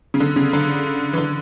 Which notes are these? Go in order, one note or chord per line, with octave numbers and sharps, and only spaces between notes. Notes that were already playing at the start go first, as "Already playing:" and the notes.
C#3
D3
C#3
D3
E3
D3